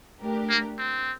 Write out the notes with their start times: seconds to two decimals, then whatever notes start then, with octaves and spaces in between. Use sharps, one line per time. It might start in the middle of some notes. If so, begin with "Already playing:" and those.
0.21 A3 D4 G4 A#4
0.49 A#3
0.78 C4